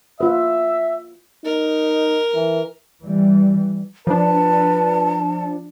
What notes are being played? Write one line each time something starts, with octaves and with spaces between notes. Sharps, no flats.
F4 B4 E5
D#4 A#4
E3
E3 G3
F3 D4 B4 A5